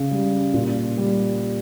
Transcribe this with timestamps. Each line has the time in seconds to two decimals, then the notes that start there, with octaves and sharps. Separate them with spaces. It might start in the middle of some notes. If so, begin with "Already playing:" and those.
Already playing: C#3
0.11 G3
0.54 A#2
0.97 G3